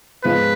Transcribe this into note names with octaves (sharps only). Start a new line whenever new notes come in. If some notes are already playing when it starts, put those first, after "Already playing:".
G#2 F3 G#3 B3 B4